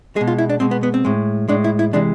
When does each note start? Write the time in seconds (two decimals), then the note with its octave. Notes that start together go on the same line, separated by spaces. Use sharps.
0.16 G#3 G#4
0.21 B2
0.27 F4
0.38 E4
0.49 D4
0.60 B2 G#3 C4
0.71 B3
0.83 B3
0.94 C4
1.05 A2 G#3
1.48 A2 G#3 D4
1.64 E4
1.79 E4
1.93 C3 E3 G#3 D4